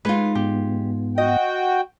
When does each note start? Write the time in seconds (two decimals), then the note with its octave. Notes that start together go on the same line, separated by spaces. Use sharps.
0.05 G#3 D#4 F4 B4
0.35 G#2 B3 G4
1.18 F#4 D#5 G5